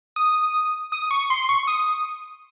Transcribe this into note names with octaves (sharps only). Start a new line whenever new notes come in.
D#6
D#6
C#6
C6
C#6
D#6